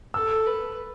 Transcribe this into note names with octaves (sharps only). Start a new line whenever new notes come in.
A4 E6
B4